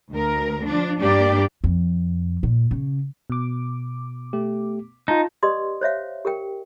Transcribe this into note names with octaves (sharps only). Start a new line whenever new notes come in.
D2 A#4
F3 D4
G2 A#3 D4 G4 D5
F2
A#2
C#3
B2 D6
A3 G4
D#4 F4 A5
G4 B4 D5 D#5 C6 D#6
C5 C#5 E5 F5
G4 A#4 G5